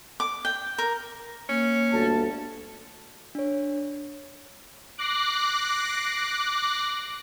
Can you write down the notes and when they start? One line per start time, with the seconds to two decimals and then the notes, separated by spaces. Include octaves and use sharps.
0.20 D6
0.45 G5
0.78 A#4
1.49 A#3 C#4
1.91 G1 D2 A5
3.35 D4 C#5
4.98 D6 F#6 A#6 C7